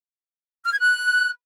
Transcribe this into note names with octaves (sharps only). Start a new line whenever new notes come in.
F6
G#6
F#6